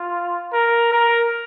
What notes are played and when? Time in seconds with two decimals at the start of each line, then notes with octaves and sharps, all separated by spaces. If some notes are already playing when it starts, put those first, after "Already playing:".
Already playing: F4
0.53 A#4
0.92 A#4